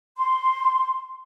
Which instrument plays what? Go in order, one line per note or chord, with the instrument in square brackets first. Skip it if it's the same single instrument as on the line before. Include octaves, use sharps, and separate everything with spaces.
[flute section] C6